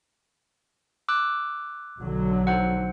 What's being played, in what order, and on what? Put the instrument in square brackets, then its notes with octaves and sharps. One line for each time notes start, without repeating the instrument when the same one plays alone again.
[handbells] D6 E6 F#6
[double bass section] B1 D3 F#3
[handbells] D#4 C5 F#5